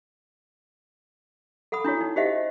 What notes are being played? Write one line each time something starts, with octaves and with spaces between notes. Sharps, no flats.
A4 F#5 B5 D#6
D4 E4 F#4 C#5
D#4
F#4 G4 C5 D#5 E5 F#5